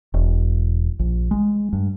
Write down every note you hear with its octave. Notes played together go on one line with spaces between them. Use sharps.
E1
A#1
G#3
G2